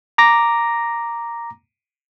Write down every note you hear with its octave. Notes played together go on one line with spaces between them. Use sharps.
A#5 D6 A#6